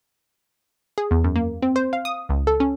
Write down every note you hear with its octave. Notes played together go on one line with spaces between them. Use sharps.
G#4
E2
F#2
A#3
C4
C5
F5
D#6
C#2
A4
C#4